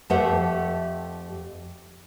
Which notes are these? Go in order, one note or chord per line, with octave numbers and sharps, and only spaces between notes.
F2 A3 G4 C5 E5 F#5